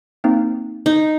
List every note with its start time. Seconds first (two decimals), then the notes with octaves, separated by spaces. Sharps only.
0.24 A#3 C4 D#4
0.86 D#4